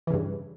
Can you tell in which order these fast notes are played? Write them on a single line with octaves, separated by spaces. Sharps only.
E3 C#3 G2